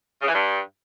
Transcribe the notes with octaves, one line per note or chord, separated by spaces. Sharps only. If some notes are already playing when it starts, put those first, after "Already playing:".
C#3
E3
G2